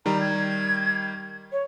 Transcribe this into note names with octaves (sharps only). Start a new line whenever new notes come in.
D#3 G3 A#5
G#6
C#5